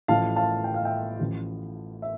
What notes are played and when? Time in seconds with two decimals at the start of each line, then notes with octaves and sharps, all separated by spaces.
0.08 A1 A2 F3 F5 A5
0.36 F5 A5
0.64 G5
0.74 F5
0.85 E5 G5
1.19 A1 A2 F3
2.02 E5